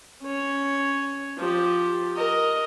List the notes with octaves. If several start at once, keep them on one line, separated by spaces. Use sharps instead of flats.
C#4 C#5
F3 G4
A#4 D#5